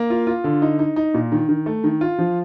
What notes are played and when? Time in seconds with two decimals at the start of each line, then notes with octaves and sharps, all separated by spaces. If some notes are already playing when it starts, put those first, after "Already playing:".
Already playing: A#3
0.10 F4
0.27 F4
0.44 D3
0.62 D#4
0.79 D#4
0.96 D#4
1.14 A#2
1.32 D#3
1.49 D#3
1.66 A3
1.84 D#3
2.01 F4
2.19 F3